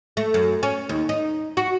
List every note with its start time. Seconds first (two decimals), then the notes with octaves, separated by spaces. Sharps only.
0.17 A3
0.34 F#2
0.63 C#4
0.89 D#2
1.09 D#4
1.57 F#4